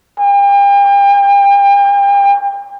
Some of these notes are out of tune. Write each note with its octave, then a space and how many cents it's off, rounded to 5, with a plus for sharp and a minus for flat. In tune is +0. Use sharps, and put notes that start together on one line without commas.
G5 +40